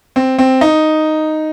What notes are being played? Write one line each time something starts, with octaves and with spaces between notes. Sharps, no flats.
C4
C4
D#4